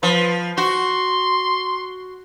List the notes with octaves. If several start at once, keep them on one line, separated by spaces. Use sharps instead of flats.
F3 B4
F#4 C6